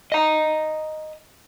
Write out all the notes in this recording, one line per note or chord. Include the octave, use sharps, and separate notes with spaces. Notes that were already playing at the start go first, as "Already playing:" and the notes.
D#5 A#5